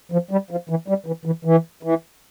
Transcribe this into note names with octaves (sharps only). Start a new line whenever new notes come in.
F3
G3
F3
E3
G3
E3
E3
E3
E3